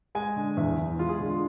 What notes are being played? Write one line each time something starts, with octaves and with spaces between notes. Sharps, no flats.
G#3 G#5
D3
E2 E5
E2
G#3 F4
G#4
D3 F4